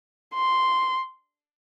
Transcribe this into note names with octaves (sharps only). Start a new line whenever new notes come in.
C6